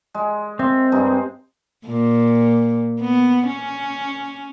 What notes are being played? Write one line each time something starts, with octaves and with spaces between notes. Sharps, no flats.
G#3
C4 E5
G2 G#3 D#4
A#2
B3
C#4